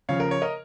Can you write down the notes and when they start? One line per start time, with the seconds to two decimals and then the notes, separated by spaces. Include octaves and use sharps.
0.09 C#3 F3 C#5 F5
0.20 A#4
0.31 C#5
0.42 A#4 D#5